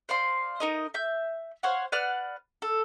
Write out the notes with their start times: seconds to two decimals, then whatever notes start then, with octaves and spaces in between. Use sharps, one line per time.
0.09 C5 D5 F5 C6
0.60 D#4 A#4 D#5
0.94 E5 G6
1.63 C5 C#5 F5 F#5
1.92 B4 D5 F#5 F6
2.62 A4